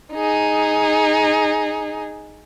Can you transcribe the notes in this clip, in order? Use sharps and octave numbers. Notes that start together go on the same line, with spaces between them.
D#4 G#4